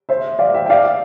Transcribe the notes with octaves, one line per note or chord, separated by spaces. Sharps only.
C5 E5
D5 F5
E5 G5
G5
D5 F5